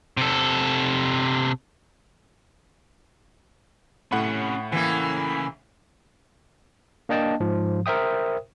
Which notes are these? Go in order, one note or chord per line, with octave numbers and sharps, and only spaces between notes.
C3 A4
A2 C3 C#4 F#5 B5
C#3 E3 A#3 G5
A#3 D4 D#5 G5 A5
G#2 F3
A#4 C5 E5 G5 D#6